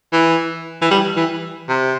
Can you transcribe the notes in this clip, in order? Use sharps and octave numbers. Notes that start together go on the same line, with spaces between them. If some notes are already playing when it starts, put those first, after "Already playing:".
E3
E3
G3
E3
C3